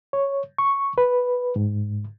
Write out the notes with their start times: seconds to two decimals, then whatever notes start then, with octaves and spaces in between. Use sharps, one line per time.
0.13 C#5
0.58 C#6
0.98 B4
1.56 G#2